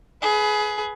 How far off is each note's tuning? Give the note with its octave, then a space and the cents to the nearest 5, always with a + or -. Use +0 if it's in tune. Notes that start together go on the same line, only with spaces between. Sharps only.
G#4 +25 B4 +0